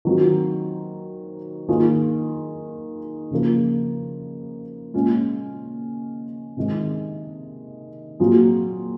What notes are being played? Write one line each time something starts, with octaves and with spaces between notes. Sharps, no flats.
D#3 F#3 C4 F4
D#3 A#3 F4 G#4
C#3 F3 A#3
A#2 G#3 C#4 F4
C3 D#3 G#3
A#2 F#3 C4 F4 G#4